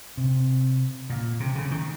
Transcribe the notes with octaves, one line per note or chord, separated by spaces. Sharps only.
C3
A#2
C3
C#3
D#3